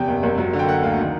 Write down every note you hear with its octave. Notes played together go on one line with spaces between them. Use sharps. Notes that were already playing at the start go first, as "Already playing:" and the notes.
Already playing: E2 C3 G5
F#1
F#1
F#3
D3
G5
A#3 F#5
D2 F5
D#3